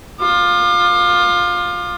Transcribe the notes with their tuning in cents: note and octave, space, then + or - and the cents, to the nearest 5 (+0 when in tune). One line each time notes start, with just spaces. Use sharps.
F4 +15 D6 +35